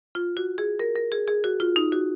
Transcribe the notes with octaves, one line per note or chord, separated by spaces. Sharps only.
F4
F#4
G#4
A#4
A#4
G#4
G#4
F#4
F4
D#4
F#4